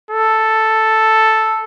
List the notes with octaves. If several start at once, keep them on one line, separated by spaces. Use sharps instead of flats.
A4